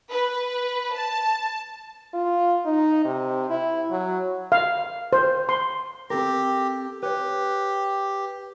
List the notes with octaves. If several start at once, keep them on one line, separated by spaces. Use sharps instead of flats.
B4
A5
F4
D#4
C3
E4
F#3
F5
C5
C6
C4 G4 A4 A#4
G4 B4 C#5